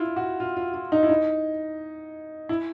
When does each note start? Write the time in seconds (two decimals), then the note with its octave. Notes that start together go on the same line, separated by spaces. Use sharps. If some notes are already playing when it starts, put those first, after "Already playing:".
Already playing: E4 F4
0.16 F#4
0.40 F4
0.57 F4
0.74 F4
0.92 D#4
1.03 E4
1.09 D#4
2.49 E4